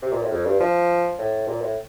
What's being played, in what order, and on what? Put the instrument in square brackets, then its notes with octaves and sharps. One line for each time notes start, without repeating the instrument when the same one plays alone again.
[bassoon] C3
A#2
A2
F2
G2
F3
A2
A#2
A2